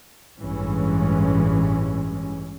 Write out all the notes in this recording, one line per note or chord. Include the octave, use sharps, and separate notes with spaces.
A1 G2 E3 G#3 C#4